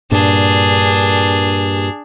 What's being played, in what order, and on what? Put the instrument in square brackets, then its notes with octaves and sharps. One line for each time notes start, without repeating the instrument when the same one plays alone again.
[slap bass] G2 A#2 [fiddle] D4 G#4